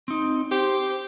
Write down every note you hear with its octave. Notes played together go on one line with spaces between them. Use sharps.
C4 D#4
G4 C5